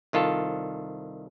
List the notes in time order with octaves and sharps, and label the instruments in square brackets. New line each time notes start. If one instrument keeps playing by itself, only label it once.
[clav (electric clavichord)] C2 D#3 F4 A4